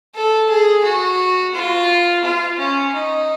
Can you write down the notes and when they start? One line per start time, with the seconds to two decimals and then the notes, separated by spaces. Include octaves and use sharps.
0.15 A4
0.49 G#4
0.84 F#4
1.54 F4
2.24 F4
2.58 C#4
2.94 D#4